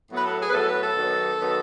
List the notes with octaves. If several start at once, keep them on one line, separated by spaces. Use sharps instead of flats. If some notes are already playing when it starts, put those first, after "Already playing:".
A2 F#3 B3
B4
A4
G#4
B4
A2 F#3 B3 A4
B4
A4
D#3 F#3 B3
D#3 F#3 B3